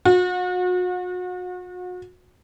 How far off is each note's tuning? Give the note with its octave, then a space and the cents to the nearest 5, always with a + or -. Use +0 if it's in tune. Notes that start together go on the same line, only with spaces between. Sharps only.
F#4 -35